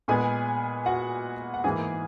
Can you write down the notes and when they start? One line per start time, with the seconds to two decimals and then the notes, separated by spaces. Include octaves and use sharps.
0.08 A#2 G#3 B3 G#4 G#5
0.86 F#4 F#5
1.54 F#5
1.64 G#2 E3 A#3 G#4 G#5